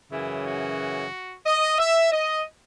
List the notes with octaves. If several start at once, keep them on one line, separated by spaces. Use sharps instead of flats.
F#2 C#3 E3 E4
F#4
D#5
E5
D#5